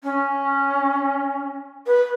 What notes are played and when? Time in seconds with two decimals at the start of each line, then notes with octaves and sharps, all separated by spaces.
0.03 C#4
1.87 B4